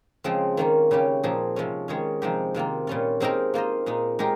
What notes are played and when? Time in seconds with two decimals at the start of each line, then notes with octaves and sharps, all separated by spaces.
0.24 C#3 F3 G#3 C4
0.57 D#3 A#3 C#4 F4
0.91 C#3 G3 C#4 G4
1.23 A#2 F3 C4 D#4 G#4
1.56 C3 F3 G#3 C#4
1.88 D#3 G#3 C#4 G#4 C#5
2.22 C3 F3 G#3 D#4 G4
2.54 C3 D#3 A#3 F4
2.87 A#2 G3 C#4 F4
3.20 G#3 C4 D#4 G4 A#4
3.54 A#3 F4 C5 D#5
3.86 A#2 G#3 D#4
4.19 G#3 D#4 G4 A#4